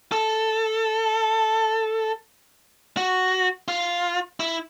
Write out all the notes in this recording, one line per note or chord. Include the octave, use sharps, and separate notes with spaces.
A4
F#4
F4
E4